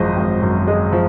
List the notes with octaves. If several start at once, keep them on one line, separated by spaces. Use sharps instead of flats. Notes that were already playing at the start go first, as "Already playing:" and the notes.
Already playing: G#1 F#2 F3 G#3 C5 D#5
G#1
F#2
G#3 D#5
F3